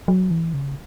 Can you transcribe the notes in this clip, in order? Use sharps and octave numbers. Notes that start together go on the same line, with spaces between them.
F#3
E3
C#3